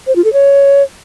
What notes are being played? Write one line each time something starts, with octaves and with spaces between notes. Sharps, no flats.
C5
F4
A4
C#5